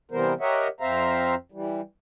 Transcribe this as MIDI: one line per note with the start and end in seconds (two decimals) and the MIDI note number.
0.11 0.33 48
0.11 0.33 52
0.11 0.33 55
0.11 0.33 59
0.11 0.33 70
0.11 0.33 72
0.40 0.68 67
0.40 0.68 70
0.40 0.68 73
0.40 0.68 75
0.40 0.68 76
0.40 0.68 78
0.80 1.35 41
0.80 1.35 60
0.80 1.35 72
0.80 1.35 76
0.80 1.35 77
0.80 1.35 82
1.52 1.81 52
1.52 1.81 55